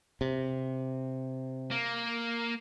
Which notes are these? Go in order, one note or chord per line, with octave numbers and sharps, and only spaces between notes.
C3
A#3